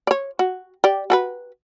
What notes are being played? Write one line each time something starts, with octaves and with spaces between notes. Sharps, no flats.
C#5 D5
F#4
G4 D5
F#4 A4 B4